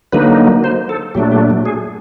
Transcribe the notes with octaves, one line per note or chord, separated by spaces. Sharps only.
D3 F#3 A#3 D#4 B4
C5
A4
A#2 F#3 A3 D4 G4
G4
G#4